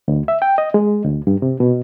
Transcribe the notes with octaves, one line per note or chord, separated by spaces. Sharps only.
D2
E5
G5
D#5
G#3
D2
G2
C3
B2